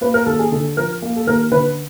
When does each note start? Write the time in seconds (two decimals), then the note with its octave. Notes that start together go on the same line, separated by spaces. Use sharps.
0.01 A#3 B4
0.14 A#4
0.26 D#2 A4
0.39 G#4
0.51 D3 A4
0.77 F3 A#4
1.02 A#3
1.16 A4
1.27 D#2 A#4
1.51 D3 B4